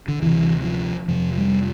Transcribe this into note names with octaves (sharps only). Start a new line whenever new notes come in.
D3
D2 C3 E3
F3
F2 C3 F3
G3